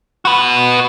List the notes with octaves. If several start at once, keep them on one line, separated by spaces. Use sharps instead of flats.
F#4 B4